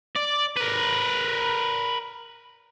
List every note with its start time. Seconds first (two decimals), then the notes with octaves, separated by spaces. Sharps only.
0.16 D5
0.57 A#4 B4